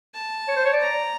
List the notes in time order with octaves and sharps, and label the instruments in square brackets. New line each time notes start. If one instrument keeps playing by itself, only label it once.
[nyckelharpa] A5
[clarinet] C#5
C5
C#5
D5
[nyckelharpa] A#5